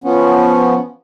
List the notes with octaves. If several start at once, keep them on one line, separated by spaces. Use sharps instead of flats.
F3 B3 C#4